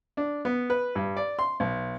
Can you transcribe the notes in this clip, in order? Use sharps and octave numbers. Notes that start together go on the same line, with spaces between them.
D4
B3
B4
G2
D5
C6
B1